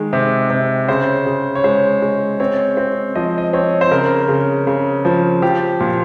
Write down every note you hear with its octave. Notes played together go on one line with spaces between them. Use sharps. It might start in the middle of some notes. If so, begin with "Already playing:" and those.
Already playing: D#3 G#3
C3
C3
C#3 C5
C#3
C#5
G#3 C5
G#3
C4 C#5
C4
F3 D#5
D#5
C4 C#5
C5
C#3 A#4
C#3
C#3
F3
F3 G4
A#2